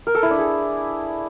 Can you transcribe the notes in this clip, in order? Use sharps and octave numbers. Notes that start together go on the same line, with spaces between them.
A#4
A4
E4
D4
G#4